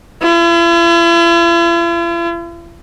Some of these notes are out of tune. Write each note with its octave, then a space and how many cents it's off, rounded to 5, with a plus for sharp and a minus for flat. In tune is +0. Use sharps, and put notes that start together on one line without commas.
E4 +45